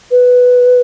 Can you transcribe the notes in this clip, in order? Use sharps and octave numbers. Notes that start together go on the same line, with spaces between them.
B4